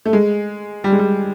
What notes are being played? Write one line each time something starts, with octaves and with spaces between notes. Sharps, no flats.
A3
G#3
G3
G#3
G3